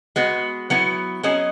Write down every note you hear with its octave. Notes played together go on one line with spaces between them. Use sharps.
G#3 B3 F#4
F#3 B3 E4
F#3 C#4 G#4 D#5